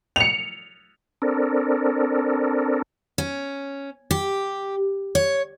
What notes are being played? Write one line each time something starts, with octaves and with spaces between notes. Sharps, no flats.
C#7 F7
C4 D4 A4 A#4
C#4
G4
C#5